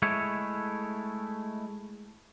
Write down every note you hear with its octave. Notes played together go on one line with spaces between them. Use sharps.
G#3 A3 E4 C#5